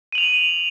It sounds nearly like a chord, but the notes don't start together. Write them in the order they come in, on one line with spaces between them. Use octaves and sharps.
D#7 F#7 F7